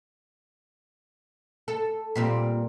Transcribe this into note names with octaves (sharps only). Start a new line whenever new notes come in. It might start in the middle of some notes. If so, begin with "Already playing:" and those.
A4
A#2 G3 C4